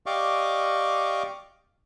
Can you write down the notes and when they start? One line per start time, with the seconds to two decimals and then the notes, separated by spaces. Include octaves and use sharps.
0.06 G4 D5 D#5 F5 C#6 D6